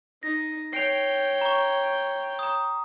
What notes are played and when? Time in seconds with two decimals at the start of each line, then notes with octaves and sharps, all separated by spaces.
0.23 D#4 A#6
0.73 C#5 G5 C7 D7 F7
1.41 A#5 C#6
2.39 A#5 D#6